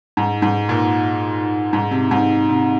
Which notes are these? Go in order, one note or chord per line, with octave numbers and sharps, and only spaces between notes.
G#2
G#2
A#2
G#2
C3
G#2
C3